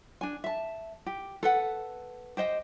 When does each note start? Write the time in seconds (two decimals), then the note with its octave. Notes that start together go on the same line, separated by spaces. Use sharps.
0.21 D4 G#5
0.44 E5 A5
1.06 G4
1.43 A4 B4 F#5
2.37 G4 C5 D#5 G5